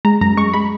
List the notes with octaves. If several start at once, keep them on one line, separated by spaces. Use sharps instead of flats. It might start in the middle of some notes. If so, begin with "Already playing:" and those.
G#3 A#5
F#2 A#5
G#3 C#6
G#3 B5